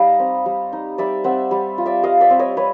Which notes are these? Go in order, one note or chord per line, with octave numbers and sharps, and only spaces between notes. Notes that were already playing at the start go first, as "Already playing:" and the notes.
Already playing: G3 D#4 D#5 F5
C4
G3
D#4
G3 D5 E5
C4 E5 F#5
G3
F4
D5 E5
G3 D#5 F5
D5 E5
C4
C#5 D#5
G3 B4 C#5